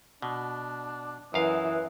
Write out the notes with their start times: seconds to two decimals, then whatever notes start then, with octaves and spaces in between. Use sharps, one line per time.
0.22 B2 D4
1.34 F#2 E3 B4 D#5 F5